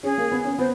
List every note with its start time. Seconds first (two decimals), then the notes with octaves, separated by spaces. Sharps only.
0.03 C#4 G#4
0.18 A#3
0.32 B3
0.45 C#4
0.58 B3 C5